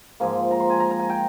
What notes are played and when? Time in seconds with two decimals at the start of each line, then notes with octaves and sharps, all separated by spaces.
0.20 G#2 F3 A#3 G#5
0.51 A#5
0.60 C6
0.70 G#5
0.80 A#5
0.91 A#5
0.99 G#5
1.09 G5